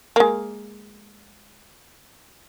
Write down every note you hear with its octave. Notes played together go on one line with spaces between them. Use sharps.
G#3 A#3